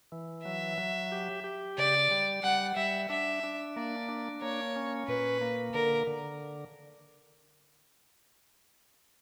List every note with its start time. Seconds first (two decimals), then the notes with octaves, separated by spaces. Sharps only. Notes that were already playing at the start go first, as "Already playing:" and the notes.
0.12 E3
0.45 F#3 E5
0.78 F#3
1.12 G4
1.44 G4
1.78 C#3 D5
2.11 G3
2.43 G3 F#5
2.77 G3 E5
3.10 D4 E5
3.44 D4
3.76 A#3 D5
4.09 D4
4.42 A#3 C#5
4.76 C#4
5.08 A#2 B4
5.41 A#3
5.74 D3 A#4
6.07 D3